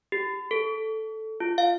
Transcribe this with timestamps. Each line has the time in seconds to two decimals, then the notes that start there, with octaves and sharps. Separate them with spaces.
0.12 G4
0.51 A4
1.40 F4
1.58 F5